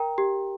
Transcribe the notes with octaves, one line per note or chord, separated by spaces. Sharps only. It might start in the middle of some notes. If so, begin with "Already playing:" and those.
Already playing: A#4 G5 A#5
G4